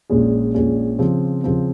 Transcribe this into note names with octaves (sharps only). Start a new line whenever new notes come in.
A#1 A#2 G#3 C#4 G#4
A#1 A#2 G#3 C#4 G#4
C#3 F3 C4
C#3 F3 C4